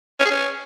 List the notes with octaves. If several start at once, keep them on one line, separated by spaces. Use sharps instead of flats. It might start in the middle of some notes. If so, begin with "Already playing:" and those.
C#4
G#4
C#4